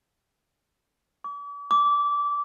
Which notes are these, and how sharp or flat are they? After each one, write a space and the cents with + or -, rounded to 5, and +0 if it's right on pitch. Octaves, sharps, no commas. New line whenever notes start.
D6 -45
D6 -20